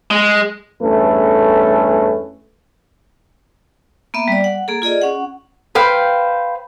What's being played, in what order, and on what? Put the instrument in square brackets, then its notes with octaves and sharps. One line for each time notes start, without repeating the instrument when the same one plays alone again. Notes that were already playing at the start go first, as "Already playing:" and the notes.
[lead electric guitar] G#3
[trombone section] E2 G2 A3 C#4 A4 B4
[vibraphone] A#3 B3 E5
G3 D5
F#5
A#3 G#4 A4
F4 G#4 D5 D#5
C#4 F#5
[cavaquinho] B4 C5 F5 G5